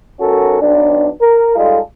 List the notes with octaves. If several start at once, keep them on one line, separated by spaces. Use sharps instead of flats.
B1 C#4 F#4 A4 A#4
B1 D4
A#4
G3 G#3 D#4 F4 A4